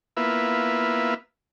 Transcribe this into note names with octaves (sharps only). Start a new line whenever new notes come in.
A#3 B3 E4 F4 B4 E5